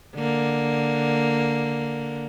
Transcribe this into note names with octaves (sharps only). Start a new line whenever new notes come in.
D3 A#3